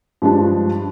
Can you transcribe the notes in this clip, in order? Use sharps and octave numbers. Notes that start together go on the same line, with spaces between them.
G2 F3 G#3 D4